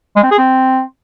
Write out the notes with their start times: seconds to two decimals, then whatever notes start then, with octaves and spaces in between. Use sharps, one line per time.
0.16 G#3
0.23 C4
0.31 G#4
0.38 C4